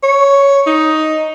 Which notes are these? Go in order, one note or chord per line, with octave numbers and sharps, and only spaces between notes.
C#5
D#4